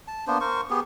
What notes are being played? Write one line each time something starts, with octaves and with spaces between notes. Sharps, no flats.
A5
A#3 B3 D4 C5
A#4 C5 C#6
B3 G4 G#4